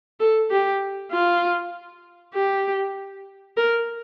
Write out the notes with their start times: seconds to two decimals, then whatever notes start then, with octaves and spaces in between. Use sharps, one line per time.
0.20 A4
0.51 G4
1.11 F4
2.34 G4
3.57 A#4